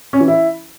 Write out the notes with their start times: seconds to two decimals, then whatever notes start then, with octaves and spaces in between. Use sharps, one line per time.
0.13 C#4
0.20 E3
0.28 E4